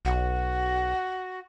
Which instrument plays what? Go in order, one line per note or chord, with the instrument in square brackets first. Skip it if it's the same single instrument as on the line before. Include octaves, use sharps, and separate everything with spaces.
[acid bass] B1 [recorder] F#4